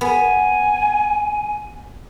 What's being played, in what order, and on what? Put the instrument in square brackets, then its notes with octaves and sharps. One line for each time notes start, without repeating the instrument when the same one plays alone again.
[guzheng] B3 [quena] G#5